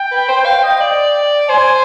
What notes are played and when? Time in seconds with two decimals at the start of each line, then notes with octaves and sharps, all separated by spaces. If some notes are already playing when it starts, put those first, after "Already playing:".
Already playing: G5
0.11 B4
0.28 C5
0.45 F5
0.63 D#5
0.80 D5
1.49 C5 G#5